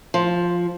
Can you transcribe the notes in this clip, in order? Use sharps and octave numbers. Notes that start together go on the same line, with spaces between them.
F3